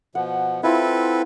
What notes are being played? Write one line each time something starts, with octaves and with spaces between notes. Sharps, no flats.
B2 F3 F#5
C4 E4 F4 A4 B4